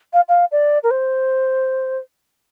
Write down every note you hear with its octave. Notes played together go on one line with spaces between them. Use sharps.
F5
F5
D5
A#4
C5